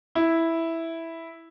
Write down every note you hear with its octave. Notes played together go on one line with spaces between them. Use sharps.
E4